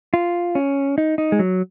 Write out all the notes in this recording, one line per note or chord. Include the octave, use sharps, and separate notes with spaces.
F4
C#4
D#4
D#4
G#3
F#3